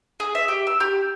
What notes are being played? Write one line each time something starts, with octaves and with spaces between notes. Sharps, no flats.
G#4
E5
G4
E6
G4